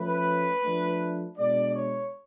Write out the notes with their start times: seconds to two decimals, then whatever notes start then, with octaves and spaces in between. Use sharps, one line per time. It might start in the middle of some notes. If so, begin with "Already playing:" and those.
Already playing: F3 A3 C#4 B4
0.64 F3 A3 D4
1.38 B2 G#3 D4 D5
1.75 C#5